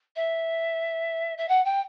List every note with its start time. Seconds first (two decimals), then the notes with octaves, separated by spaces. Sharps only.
0.16 E5
1.38 E5
1.49 F#5
1.65 G5